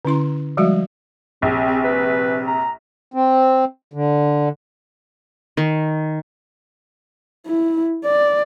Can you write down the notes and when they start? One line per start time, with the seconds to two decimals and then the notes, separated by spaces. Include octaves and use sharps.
0.05 D3 C#4 E4 C6
0.57 F3 G3 G#3 F#4 E5
1.42 A#1 C3
1.66 C4
1.84 B4
2.47 A#5
3.14 C4
3.93 D3
5.57 D#3
7.47 E4
8.05 D5